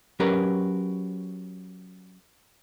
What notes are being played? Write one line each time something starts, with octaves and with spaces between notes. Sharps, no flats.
F#3 C#4 G4 A#4 B4